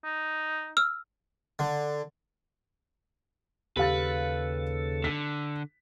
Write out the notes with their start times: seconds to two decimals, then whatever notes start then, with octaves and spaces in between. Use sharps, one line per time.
0.04 D#4
0.77 E6 F6
1.59 D3
3.77 D#2 C#3 G4 A4 B4 F5 A6
5.04 D3 B6